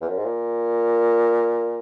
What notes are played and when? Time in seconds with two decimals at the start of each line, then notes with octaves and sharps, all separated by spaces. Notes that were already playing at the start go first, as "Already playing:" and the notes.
0.01 E2
0.09 F#2
0.17 G#2
0.25 A#2